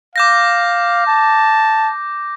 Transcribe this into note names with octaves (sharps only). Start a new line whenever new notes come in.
F5 D6 G6 A#6
A5